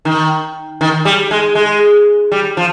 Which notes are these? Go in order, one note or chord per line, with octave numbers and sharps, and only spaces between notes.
D#3
D#3
G3
G#3
G#3
G3
F3